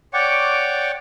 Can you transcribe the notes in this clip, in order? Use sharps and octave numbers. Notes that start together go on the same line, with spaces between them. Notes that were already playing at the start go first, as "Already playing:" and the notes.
C#5 D5 F#5 G5 C#6 D6